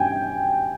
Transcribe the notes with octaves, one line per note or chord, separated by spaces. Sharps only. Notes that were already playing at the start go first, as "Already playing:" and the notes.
Already playing: G2 G3 C#4 G5 G#5